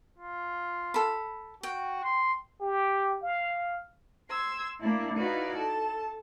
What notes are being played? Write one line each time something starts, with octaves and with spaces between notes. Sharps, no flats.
F4
A4 B5
F#4 G5
C6
G4
F5
C6 E6 G#6
A#3 D4 E4
D#4 E4 F#4 B4 D5 F5
A4 A5